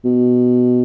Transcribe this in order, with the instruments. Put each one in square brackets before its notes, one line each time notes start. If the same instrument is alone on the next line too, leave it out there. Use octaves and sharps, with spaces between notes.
[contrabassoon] B2